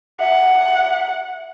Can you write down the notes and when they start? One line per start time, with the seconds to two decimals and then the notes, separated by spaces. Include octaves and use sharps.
0.20 E5 F#5